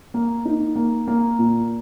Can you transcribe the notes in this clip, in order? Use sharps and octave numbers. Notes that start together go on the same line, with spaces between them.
A#3
D#4
A#3
A#3
A#2